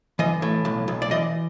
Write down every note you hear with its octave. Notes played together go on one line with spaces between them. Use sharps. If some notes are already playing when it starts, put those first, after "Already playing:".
E3 D#5
A2
B1
B1
D5
E3 D#5